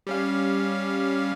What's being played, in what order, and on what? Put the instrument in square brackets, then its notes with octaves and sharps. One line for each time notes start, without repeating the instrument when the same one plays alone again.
[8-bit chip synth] G3 C#4 F5